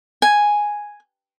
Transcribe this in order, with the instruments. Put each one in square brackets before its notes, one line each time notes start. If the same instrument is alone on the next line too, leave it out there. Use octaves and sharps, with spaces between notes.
[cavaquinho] G#5